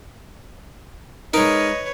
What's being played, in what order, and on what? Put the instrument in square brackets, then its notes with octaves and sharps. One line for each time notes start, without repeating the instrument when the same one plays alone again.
[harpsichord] G#3 D#4 [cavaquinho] A#4 [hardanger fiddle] B4 C#5 [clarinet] D#5